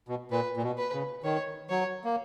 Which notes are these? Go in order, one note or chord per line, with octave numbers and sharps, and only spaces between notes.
B2
A#2 B4
A#2
B2
B4
C#3
D#3 C#5
F#3 C#5
A#3